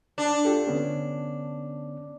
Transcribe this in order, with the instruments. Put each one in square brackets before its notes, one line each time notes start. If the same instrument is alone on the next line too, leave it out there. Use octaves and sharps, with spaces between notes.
[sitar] D4 [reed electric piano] A5
[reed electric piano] F4 G4 A4
D3 B3 C#4